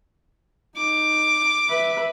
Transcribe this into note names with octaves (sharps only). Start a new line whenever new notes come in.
D#4 D6
B4 E5